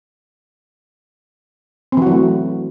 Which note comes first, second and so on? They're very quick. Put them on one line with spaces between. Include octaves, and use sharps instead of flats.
C4 E3 F#4 F#3 A3